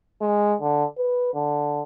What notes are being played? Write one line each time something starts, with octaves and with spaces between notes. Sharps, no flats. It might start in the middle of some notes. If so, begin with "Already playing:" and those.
G#3
D3
B4
D3